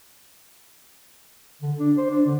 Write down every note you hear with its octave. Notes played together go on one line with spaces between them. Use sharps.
D3
D4
C5
D4
D3